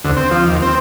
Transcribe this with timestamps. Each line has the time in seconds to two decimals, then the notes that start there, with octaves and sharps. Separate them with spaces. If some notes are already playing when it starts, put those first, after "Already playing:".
0.04 D2
0.17 C4
0.31 F3
0.45 D#2
0.62 C4